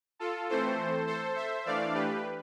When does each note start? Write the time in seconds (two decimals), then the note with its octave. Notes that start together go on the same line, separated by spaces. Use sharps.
0.19 F4 A4
0.49 E3 A3 C4 A4 C5
1.07 A4 C5
1.36 C5 E5
1.65 E3 A3 D4 D5 F5
1.94 G4 B4